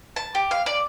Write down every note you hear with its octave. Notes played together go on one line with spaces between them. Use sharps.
A5
G4
F5
D5